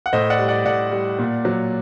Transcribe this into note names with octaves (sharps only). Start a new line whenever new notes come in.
F#5
A2 C5 D#5
D5 F#5
G3
D5 F#5
A2 D5 F#5
G3
A#2
F#3